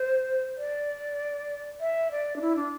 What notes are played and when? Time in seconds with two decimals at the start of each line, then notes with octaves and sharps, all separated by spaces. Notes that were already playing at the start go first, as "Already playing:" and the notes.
Already playing: C5
0.58 D5
1.81 E5
2.11 D5
2.36 D4
2.41 E4
2.57 D4